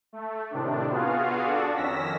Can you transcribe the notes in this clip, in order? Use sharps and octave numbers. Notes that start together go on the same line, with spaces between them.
A3
A2 C3 D#3 D4
B3 F4 F#4 G#4 F5
D4 F#4 A4 D5
F2 D#3 C#4 E6 A#6 B6